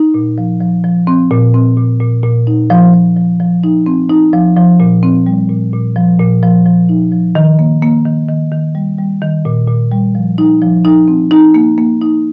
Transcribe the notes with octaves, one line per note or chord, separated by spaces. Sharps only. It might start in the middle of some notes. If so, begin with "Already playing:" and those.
Already playing: D#4
A#2
F3
F3
F3
C4
A#2
C4
A#2
A#2
A#2
D#4
F3
F3
F3
F3
D#4
C4
D#4
F3
F3
A#2
C4
G3
A#2
A#2
F3
A#2
F3
F3
D#4
F3
D#3
A#3
A#3
D#3
D#3
D#3
G3
G3
D#3
A#2
A#2
G3
F3
D#4
F3
D#4
C4
D#4
A#3
A#3
D#4